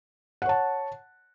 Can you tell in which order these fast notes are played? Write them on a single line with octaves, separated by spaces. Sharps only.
F#5 C#5 A5